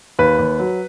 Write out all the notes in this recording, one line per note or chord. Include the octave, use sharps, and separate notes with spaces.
D#2 B4
D#2
F#3